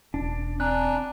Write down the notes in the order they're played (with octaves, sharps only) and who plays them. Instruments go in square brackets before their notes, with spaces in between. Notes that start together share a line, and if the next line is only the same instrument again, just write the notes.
[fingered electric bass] E1 [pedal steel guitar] D4
[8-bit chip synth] C4 G#5 A#5 [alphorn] D4 [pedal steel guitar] F#6